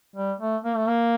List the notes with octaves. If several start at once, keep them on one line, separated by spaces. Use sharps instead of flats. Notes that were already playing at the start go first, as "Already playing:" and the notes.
G3
A3
A#3
A3
A#3